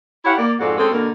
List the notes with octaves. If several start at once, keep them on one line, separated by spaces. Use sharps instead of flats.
E4 G4 C#5 F5 F#5
A#3 D5
F2 G#2 F4 F#4 A4 D5
G#3 C4 C#4 G#4 A4
B2 D3 A#3 A#4